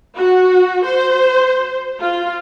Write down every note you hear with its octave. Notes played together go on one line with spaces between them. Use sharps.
F#4
C5
F4